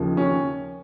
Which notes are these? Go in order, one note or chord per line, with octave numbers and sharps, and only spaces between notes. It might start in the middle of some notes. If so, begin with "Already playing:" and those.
Already playing: D#2 C#3 F3
C#4